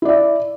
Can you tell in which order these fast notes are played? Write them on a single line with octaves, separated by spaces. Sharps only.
E4 D5 E5